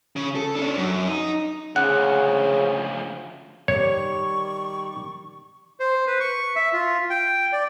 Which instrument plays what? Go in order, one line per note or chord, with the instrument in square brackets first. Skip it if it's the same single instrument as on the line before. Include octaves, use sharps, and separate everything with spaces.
[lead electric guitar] C#3
A4
C#4 D4
F#2
D#4
[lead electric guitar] D2 F3 [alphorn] C#3 [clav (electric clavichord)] F#5
[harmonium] D#3 G3 D5 [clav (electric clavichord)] C#5 [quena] C#6
[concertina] C5
B4
C#6
E5
F4
G5
D5